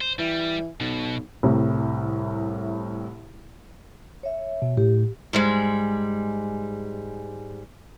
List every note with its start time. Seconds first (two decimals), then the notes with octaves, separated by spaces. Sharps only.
0.01 C5
0.19 E3 G3
0.80 B1 B2
1.43 C2 A2 C3
4.23 C#5 E5
4.62 B2
4.77 A2 G4
5.33 G#2 G3 G#3